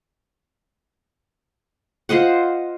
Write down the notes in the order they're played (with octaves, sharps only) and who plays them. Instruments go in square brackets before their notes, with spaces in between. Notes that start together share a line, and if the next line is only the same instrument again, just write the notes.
[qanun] F4 C5 D#5 F#5